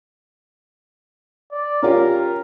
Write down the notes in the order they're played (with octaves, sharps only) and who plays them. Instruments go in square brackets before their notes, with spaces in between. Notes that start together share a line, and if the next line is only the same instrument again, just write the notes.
[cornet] D5
[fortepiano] C#4 F4 G4 [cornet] A#4